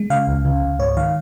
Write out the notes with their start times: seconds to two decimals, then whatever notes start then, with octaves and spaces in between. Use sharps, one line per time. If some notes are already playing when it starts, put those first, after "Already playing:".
Already playing: G#3
0.10 C#3 F5
0.27 C#2
0.45 C#3
0.62 C#2
0.79 G#2 C#5
0.97 D#3 F5